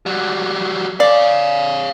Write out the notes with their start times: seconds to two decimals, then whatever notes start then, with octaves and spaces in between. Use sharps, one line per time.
0.06 F#3 G3
1.00 C#5 D5 F5